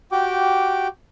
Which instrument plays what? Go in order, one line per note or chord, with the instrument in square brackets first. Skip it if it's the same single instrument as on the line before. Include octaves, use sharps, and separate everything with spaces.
[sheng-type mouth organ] F#4 G4 G5 D6